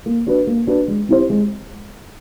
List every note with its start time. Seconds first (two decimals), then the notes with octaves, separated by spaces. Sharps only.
0.06 A#3
0.27 D4 F#4 B4
0.47 A#3
0.67 D4 F#4 B4
0.88 G#3
1.09 C4 E4 G4 C5
1.30 G#3